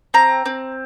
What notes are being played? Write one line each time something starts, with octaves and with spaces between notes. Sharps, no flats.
C4 A#5
C4